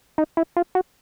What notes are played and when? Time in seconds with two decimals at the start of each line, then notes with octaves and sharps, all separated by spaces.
0.18 D#4
0.37 E4
0.57 F4
0.75 F#4